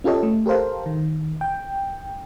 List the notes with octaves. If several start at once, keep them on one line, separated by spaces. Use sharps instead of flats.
C#4 F4 G4 A4 C#5 D#5
A3
G4 A4 A#4 C5 F5
D#3
G5